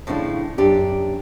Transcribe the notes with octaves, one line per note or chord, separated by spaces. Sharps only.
A2 C#3 F3 D4 E4
F#2 D4 G4